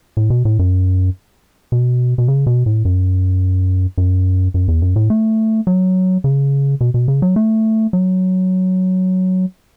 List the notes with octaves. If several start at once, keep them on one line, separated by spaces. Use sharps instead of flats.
A2
B2
A2
F#2
B2
B2
C#3
B2
A2
F#2
F#2
F#2
E2
F#2
A2
A3
F#3
C#3
B2
B2
C#3
F#3
A3
F#3